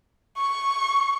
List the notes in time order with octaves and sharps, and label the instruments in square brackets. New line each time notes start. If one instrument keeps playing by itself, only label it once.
[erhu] C#6